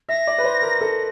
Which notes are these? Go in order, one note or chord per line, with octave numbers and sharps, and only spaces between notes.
E5 A#6
D5
B4
C5
A#4
A4